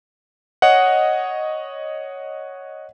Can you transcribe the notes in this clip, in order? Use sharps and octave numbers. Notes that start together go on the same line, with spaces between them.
C#5 D#5 F#5